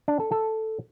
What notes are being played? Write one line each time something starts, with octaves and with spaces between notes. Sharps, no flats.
D4
A4
A4